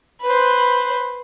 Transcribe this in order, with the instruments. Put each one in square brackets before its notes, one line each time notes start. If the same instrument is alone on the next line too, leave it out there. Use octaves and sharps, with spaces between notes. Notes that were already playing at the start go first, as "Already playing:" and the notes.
[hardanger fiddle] B4 C5